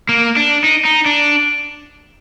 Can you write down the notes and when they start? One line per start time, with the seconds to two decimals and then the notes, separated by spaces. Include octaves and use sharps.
0.09 A#3
0.37 D4
0.64 D#4
0.85 D#4
1.06 D4